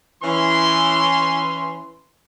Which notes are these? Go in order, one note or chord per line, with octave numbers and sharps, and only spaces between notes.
E3 C#4 C6